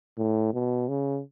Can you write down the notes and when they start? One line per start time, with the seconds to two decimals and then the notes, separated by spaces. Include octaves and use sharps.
0.18 A2
0.53 B2
0.89 C#3